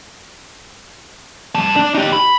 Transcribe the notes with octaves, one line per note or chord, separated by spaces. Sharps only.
G2 A5
D4
D#4 G4
B5